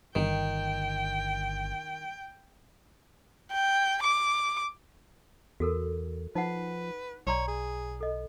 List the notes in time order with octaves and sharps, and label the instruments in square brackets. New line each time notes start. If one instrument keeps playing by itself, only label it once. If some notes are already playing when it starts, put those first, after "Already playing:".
[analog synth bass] G1 [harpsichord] D#3 [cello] G5
[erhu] G5
D6
[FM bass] E2 [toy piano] F#4 A4 A#4
[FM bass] F3 [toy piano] D#4 F#5 [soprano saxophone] B4
[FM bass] B1 [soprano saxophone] C#5 [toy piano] D5 A#5 C6
[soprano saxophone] G#4
[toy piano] A4 D#5